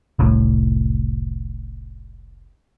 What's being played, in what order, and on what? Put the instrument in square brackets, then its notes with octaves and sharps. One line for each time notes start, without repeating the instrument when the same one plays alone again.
[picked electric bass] F1 C2 A2